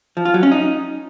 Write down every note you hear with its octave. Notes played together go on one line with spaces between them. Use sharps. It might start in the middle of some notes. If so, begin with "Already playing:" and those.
F3
F4
F#3
C#4
D#4